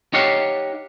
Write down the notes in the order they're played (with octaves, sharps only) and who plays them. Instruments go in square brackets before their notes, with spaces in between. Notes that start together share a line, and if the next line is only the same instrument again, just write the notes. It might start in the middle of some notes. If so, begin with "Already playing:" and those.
[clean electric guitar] D#4 G4 C#5 F5 F#5